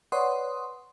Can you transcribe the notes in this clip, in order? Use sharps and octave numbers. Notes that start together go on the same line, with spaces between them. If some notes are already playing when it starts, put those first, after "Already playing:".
B4 C#5 D5 F#5 C6 D#6